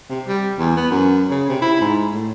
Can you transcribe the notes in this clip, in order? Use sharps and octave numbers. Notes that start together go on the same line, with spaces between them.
C3
G3
E2
B3
F#2
C#3
C3
E4
G#2
A2